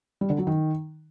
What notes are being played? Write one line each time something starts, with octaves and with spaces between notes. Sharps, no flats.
G3
D3
F#3
D#3